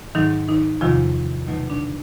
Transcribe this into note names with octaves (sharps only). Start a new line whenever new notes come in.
G#2 D#3 F#3 D#4
D#3 D#4
E2 C3 D#3 F3 F#3 F4
B2 D#3 F#3 A3 D#4
D3 D4